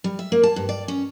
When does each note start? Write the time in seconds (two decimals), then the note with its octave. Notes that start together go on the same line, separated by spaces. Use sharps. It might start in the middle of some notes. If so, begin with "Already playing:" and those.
0.04 G3
0.19 E5
0.32 A#3
0.43 A5
0.56 G2
0.69 D5
0.88 C#4